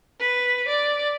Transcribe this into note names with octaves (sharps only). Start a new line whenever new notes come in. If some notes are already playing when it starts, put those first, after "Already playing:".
B4
D5